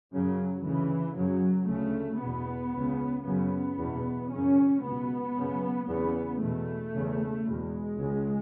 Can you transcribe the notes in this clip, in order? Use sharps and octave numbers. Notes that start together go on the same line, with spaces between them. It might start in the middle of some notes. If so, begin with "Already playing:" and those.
F#2 C#3 F#3
D2 C#3 E3
F#2 C#3 F#3
D2 C#3 A3
E2 B2 B3
C#2 C#3
F#2 C#3 B3
E2 B2
F#2 C#3 C#4
C#2 B2 B3
F#2 C#3
E2 C#3 B3
E2 B2 A3
E2 C#3
E2 B2 G#3
C#2 C#3